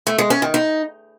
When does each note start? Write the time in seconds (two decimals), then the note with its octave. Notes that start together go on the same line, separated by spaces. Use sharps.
0.07 A3
0.18 G#3
0.30 C#4
0.42 D#3
0.54 D#4